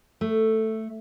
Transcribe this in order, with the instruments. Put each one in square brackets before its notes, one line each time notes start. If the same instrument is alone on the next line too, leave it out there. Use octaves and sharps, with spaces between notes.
[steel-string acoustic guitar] A3